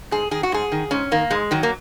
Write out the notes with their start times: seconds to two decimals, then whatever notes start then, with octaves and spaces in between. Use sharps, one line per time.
0.11 G#2 G#4
0.31 D#3 G#4
0.43 F#4
0.52 G#2 G#4
0.72 D#3
0.91 G#2 C#4
1.12 D#3 A#3
1.30 G#2 G#3
1.51 D#3 F#3
1.63 A#3